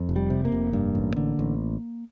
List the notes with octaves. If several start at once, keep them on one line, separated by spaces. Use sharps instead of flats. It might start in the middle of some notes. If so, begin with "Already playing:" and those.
Already playing: F2
F1
G3
C3
A#3
F1
G2
A1
D3
A1